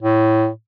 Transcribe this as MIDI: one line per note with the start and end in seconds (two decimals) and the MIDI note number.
0.02 0.48 45